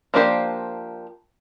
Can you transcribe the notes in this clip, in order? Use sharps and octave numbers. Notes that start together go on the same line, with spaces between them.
F3 A#3 D4 G4 C5